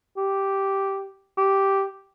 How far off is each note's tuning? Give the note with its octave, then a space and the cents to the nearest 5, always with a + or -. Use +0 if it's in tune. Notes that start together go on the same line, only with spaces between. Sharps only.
G4 -5
G4 -5